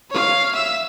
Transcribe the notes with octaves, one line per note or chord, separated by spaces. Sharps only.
C#5 F5
E5 E6